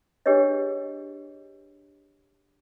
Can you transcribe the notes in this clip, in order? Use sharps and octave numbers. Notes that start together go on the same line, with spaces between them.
D4 G4 G#4 B4 C#5 D#5